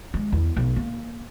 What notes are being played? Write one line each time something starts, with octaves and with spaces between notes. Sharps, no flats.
G#3
E2
B1
A#3